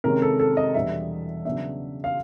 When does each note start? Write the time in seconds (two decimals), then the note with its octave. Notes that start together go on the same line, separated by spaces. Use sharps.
0.04 C3 D#3 G#3 C#4 A#4
0.22 A4
0.40 A4
0.57 D#5
0.74 E2 B2 G3 B3 D4 E5
1.45 C#3 F#3 B3 D4 E5
2.04 F5